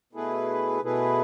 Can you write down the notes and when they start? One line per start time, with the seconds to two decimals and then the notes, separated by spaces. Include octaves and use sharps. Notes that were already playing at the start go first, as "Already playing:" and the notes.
0.13 B2 A3 E4 G#4 B4
0.82 B2 A3 E4 G#4 B4